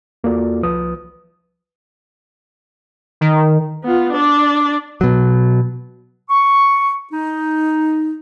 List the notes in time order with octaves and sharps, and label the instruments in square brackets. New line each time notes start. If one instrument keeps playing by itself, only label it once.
[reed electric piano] E2 A#3 F4 F#4 A4 D5
C2 F3 B4 D#6
[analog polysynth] D#3
[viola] B3 F4
D4 D5
[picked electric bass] B2 F#3
[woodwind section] C#6
D#4